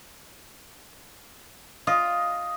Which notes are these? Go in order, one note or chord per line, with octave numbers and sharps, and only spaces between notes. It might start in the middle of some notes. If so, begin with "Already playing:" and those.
F4 D#5